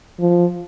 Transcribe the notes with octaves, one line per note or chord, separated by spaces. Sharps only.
F3